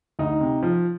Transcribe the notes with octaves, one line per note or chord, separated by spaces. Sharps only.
D2 D#4
C3
F3